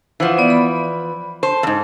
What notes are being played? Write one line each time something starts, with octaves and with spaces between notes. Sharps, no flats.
E3 F3 C5 F#5
B3 D5
B5
C5 A5
F2 G#2